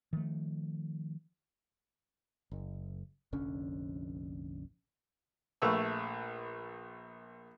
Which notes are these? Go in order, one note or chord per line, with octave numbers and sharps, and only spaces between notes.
D#3 F3 A3
F#1
F1 A#1 D3 C#4
A#1 A3 B4 C#6 E6